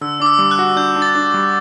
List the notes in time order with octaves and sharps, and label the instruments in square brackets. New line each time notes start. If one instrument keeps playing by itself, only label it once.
[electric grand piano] D3 [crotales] E6
[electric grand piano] D4 [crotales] D6
[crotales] E6
[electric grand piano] G3
[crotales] F#6
[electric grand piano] F#4
[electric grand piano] D4 [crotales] G6
[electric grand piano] D4
[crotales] A6
[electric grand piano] D4
G3